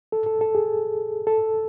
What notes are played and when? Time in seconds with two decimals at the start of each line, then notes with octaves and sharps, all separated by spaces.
0.12 A4
0.26 A4
0.41 A4
0.55 G#4
1.27 A4